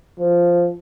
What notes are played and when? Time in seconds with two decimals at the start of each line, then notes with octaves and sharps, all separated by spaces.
0.19 F3